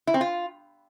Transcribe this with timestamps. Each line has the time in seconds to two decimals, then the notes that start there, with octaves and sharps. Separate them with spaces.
0.07 E4
0.14 C4
0.21 F4